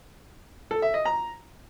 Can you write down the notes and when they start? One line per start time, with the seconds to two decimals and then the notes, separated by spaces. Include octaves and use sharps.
0.71 A4
0.82 E5
0.94 D#5
1.05 A#5